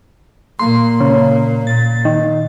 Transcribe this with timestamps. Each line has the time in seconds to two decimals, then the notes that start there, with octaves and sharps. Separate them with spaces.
0.59 A#2 A#3 C6
1.01 C#3
1.67 A#2 A6
2.05 D#3